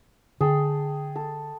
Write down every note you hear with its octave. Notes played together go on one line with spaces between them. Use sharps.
D3 G#4 G5 A5
A4